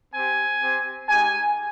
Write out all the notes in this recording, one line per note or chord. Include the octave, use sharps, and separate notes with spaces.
C4 G4 G#5
C4 G4
G#3 D#4 G4 G#5